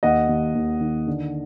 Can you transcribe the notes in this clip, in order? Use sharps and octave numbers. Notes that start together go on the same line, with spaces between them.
D#2 D#5 F#5
D#2
D#2
D#3
D3